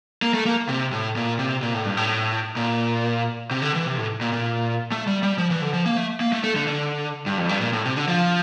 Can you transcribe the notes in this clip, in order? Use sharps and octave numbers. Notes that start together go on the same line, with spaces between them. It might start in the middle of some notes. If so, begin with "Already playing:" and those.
A#3
A3
A#3
C3
A2
A#2
C3
A#2
A2
G2
A2
A#2
C3
D3
E3
C3
A2
A#2
A#2
A3
G3
G3
F3
E3
D3
F3
A#3
A3
A#3
A3
A3
D3
D3
G2
F2
G2
A#2
A2
C3
D3
F3